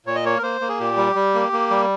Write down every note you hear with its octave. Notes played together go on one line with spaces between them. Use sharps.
A#2 C#5
D#5
A#3 C#5
A#4
A#3 C5
A#3
G#4
A#2 G4
G3
G3
A#3
A#3
G3